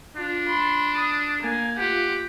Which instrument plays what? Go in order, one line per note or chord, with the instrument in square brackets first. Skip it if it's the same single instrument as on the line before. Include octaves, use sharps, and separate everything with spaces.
[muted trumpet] D4 [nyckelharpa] F4
[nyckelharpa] B5 C6
D#6
A#3 G#5
[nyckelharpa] F4 F#5 [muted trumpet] G4